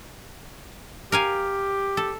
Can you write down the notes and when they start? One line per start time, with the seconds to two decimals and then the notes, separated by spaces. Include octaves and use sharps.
1.12 G4 A#4 F5 G#5
1.97 A4